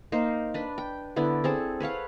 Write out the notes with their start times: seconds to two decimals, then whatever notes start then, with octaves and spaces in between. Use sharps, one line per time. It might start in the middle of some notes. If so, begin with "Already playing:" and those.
0.12 A#3 D#4 C5
0.54 D4 B4
0.78 G5
1.16 D3 B3 E4 D5
1.44 C4 G#4 A4
1.80 B4 C#5 F5 F#5